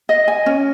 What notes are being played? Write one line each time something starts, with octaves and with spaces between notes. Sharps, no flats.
D#5
G#5
C#4